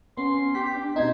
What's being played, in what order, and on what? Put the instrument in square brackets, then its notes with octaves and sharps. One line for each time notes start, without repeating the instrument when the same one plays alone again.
[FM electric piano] B3 [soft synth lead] C#4 [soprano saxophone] C6
[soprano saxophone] G4 [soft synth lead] B6
[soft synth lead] D4
[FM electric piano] B2 C4 D#4 [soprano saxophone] C5 [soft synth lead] G#6